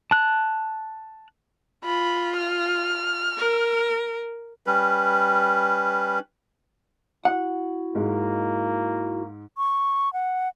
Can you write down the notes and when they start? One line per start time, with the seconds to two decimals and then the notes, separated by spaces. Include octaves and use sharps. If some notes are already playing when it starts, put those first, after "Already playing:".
0.11 A5 F#6
1.85 F4 B5
2.37 F6
3.38 A#4
4.66 G3 C#4 B4
7.25 E4 F#4 F#5
7.95 G#2 G#3 A#3
9.57 C#6
10.13 F#5